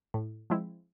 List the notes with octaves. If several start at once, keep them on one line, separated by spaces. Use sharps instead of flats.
A2
F3 G#3 C4 E4